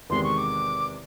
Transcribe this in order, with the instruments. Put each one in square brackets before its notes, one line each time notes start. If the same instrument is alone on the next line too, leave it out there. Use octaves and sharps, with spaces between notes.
[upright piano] E2 C3 D#3 G#3 [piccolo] C6
[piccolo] C#6
D6